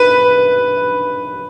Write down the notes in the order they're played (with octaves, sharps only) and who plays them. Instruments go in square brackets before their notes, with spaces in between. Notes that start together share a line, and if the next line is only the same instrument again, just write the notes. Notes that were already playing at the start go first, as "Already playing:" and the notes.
Already playing: [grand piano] B4